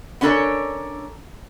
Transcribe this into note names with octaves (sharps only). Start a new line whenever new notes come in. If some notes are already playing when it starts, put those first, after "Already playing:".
B3 C#4 D4 A4 A#4 C#5